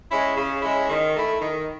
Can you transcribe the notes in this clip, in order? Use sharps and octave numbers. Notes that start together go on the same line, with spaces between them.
G#3 C#4 E4
C#3
G#3 C#4 E4
D#3
A3 E4
D#3